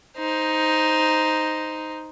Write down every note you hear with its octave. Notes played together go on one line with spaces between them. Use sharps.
D#4 C5